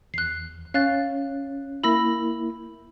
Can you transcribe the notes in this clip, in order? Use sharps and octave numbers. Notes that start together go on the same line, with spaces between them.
E2 F#6 C7
C#4 F5 F#6 A6
A#3 E4 B5 E6 A#6